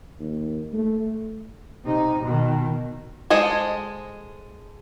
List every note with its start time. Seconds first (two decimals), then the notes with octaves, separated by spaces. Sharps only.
0.19 D#2
0.73 A3
1.85 C3 D#4
2.23 B2 D#3
3.30 G#3 A4 C5 D#5 G#5